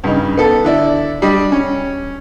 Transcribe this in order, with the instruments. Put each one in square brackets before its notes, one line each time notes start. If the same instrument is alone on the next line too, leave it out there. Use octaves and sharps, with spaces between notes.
[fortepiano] G2 C#3 D#4
B3 A4
D3 E4 D5
G3 D4 D#5
C#4